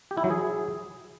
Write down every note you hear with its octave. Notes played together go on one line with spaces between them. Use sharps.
G4
E4
F#3
G#4